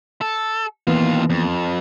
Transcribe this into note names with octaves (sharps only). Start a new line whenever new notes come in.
A4
D#2 E3 A#3 B3 F4
F2